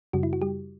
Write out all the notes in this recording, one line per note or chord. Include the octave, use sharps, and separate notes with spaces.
F#2 C#3 G3 F#4
E4
F#4
G3 G4